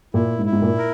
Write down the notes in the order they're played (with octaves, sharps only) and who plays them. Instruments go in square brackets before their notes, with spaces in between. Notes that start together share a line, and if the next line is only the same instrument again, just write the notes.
[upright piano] A#2 [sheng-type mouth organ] E4
[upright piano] G#2
[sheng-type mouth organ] E4
[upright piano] G#2
A#2
[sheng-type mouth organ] A#4